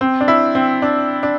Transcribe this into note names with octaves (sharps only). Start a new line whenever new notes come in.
C4
D4
E4
C4
D4
D4